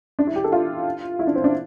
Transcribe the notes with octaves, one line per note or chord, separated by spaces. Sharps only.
D4
E4
G4
A4
F4
E4
D4
C4
D4